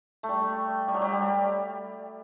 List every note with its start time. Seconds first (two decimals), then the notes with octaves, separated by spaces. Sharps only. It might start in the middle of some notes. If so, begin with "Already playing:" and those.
0.23 A3
0.29 G3
0.88 G3
0.94 F#3
1.02 G3